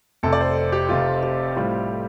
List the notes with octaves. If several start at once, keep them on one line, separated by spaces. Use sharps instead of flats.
F1 F2 C3 A4
D5
C5
G4
F1 F2 C3 F4
G4
A2 G3 C4 F4